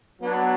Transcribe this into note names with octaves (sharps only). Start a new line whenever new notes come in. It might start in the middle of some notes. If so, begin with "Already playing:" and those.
F#3 B3 D4